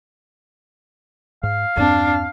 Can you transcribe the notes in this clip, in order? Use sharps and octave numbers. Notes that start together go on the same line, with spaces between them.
G#2 F5
E2 G2 C4 D4